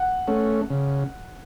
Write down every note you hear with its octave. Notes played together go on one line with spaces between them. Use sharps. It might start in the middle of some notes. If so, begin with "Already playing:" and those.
Already playing: F#5
A3 C#4
C#3